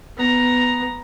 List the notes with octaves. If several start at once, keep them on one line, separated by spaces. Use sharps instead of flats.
B3 A#5